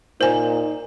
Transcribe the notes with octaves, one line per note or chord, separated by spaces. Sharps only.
A#2 D#4 C5 G#5